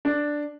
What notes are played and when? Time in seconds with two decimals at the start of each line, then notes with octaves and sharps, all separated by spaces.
0.05 D4